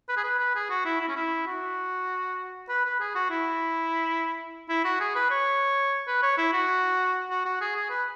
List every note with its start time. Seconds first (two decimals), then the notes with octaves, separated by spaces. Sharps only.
0.09 B4
0.17 G#4
0.24 B4
0.39 B4
0.55 G#4
0.70 F#4
0.85 E4
1.00 E4
1.08 C#4
1.16 E4
1.47 F#4
2.69 B4
2.85 B4
3.00 G#4
3.15 F#4
3.30 E4
4.69 E4
4.85 F#4
5.00 G#4
5.15 B4
5.31 C#5
6.07 B4
6.22 C#5
6.38 E4
6.53 F#4
7.30 F#4
7.45 F#4
7.61 G#4
7.76 G#4
7.90 B4